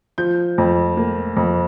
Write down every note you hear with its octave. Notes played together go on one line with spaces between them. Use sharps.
F3 G6
F2
A#3
F2